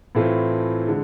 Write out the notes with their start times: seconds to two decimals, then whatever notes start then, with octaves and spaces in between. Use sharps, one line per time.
0.15 A2 E3 A3 C4 F4
0.88 D3 G#3